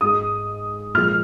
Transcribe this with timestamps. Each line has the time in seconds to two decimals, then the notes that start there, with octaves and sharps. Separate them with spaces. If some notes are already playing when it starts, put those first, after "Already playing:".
0.01 G#2 G#3 D#6
0.94 A#2 F3 G#3 F6